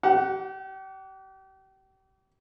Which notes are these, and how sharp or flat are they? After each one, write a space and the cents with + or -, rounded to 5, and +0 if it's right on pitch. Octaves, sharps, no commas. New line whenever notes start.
G4 -35 F#5 +0